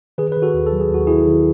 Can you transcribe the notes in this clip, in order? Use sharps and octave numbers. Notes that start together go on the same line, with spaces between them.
D#3 G#4 B4
D#3 B4
F#4 A4
D#2
A4
F#3
G#4
D#2 F#4
D#3 E4 G#4
D#3